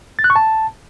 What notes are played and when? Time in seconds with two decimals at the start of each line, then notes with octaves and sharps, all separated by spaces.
0.19 A6
0.24 F#6
0.30 C#6
0.36 A5